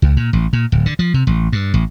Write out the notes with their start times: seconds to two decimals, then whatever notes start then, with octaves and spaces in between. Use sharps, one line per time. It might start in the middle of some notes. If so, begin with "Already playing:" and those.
0.02 C#2
0.17 A#2
0.33 A1
0.53 A#2
0.72 D1
0.86 D3
0.99 F3
1.14 C3
1.27 A1
1.52 G2
1.74 A1